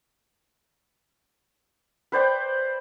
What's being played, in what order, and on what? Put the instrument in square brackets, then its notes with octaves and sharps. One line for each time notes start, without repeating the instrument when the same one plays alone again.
[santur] B4 C5 D5 G5